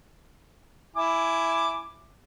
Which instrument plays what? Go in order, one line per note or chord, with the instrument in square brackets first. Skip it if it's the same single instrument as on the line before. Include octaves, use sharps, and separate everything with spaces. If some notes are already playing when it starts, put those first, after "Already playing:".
[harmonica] E4 G#5 D6